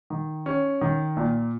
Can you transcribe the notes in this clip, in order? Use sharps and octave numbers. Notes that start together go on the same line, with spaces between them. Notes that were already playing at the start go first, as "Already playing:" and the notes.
D#3
C#4
D#3
A#2